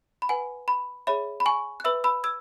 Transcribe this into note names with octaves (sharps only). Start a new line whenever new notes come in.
B5
B4 F#5 G#5
B5
G#4 C#5 E5 B5
B5
G#5 C#6
F#6
B4 E5 B5 E6
B5 E6
E6 G#6